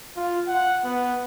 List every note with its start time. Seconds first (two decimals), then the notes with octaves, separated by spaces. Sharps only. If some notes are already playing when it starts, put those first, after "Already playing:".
0.17 F4
0.48 F#5
0.85 B3